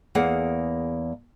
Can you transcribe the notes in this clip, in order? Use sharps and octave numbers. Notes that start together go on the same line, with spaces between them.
E2 A#3 G#4 F#5